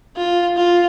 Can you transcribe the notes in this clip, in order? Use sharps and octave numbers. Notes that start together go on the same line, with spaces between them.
F4
F4